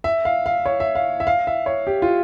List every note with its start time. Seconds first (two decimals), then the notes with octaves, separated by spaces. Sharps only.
0.04 E5
0.25 F5
0.46 F5
0.66 C#5
0.80 E5
0.95 F5
1.20 E5
1.27 F5
1.47 E5
1.66 C#5
1.87 G4
2.02 F4